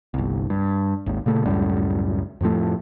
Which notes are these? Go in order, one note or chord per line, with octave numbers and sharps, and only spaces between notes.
G1 C2
G2
G#1 D#2
A#2 C#3 A3
C#2 F#2 A2 G3
F2 A2 F3 A3